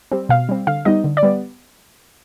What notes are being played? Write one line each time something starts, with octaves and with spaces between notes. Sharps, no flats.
G3 C4
B2 F5
G3 C4
D3 F5
G3 B3 D#4 D#5
D3
D5
G3 B3